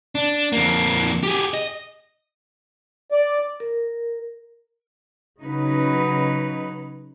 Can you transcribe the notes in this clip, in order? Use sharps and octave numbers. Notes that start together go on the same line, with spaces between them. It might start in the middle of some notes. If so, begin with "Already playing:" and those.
D4
F2 A#3
G4 G#4
D#5
D5
A#4
C#3 F#3 D#4 B4